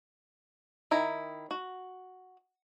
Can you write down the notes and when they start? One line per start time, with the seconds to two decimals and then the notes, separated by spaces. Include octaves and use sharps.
0.91 D#3 E4 A#5
1.51 F#4